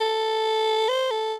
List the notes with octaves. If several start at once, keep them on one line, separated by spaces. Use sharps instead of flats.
A4
C5
A4